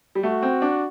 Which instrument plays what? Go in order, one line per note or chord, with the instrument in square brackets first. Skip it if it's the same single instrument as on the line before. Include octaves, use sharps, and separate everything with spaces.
[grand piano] G3
[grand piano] A3 [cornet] F#4
[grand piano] C4
D4